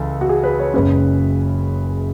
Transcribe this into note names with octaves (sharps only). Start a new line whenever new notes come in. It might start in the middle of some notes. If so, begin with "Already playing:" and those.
Already playing: C#2 E3 A4
F#4
G#4
B4
C#5
F#1 F#2 C#3 G#3 C#4 B4